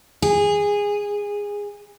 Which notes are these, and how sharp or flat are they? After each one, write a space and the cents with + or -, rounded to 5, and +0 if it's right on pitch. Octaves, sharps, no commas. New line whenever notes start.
G#4 -15